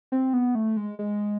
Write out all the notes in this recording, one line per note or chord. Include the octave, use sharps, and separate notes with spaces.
C4
B3
A3
G#3
G#3